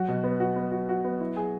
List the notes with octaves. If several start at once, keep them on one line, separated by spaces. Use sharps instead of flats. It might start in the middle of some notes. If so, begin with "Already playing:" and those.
Already playing: F#3 F#4
B2
B3
F#4
B3
F#4
F#4
B3
E4
G#4